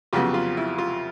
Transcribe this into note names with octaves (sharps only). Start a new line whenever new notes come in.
F2 C#3 F#3 B3 F4 G4
F4
E4
F4